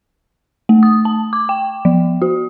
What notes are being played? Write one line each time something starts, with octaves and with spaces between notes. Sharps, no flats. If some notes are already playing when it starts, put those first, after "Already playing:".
A3
D#6
A5
D6
G5
F3
F#4